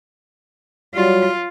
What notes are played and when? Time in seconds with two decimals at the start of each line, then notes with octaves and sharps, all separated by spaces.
0.95 F#3 G3 F4